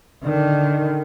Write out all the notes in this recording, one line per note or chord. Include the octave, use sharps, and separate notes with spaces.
D3 D#3